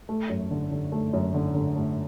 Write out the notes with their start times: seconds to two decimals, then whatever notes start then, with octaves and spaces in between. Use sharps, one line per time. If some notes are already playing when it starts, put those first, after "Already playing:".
0.09 A3
0.29 F#2
0.51 D3
0.71 D3
0.92 A3
1.13 F#2
1.34 D3
1.55 D3
1.76 A3